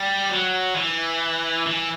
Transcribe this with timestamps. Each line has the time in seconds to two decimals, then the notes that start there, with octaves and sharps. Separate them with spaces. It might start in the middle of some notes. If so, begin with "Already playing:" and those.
Already playing: G3
0.30 F#3
0.75 E3
1.66 E3